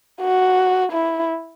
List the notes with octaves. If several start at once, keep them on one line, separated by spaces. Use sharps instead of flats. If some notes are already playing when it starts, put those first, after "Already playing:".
F#4
E4